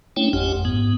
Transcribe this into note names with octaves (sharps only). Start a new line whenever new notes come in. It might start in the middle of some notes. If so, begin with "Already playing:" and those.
A3 C#4 D4 E4 C#5 G5
G#1 F2 G4 F#5 G#5
G#2 B3